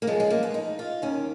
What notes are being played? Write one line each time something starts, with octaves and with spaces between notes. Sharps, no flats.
A#3
F#2 F3 G#3
G#3
A#3
B3
D#4
F4
D#2 D#3 C#4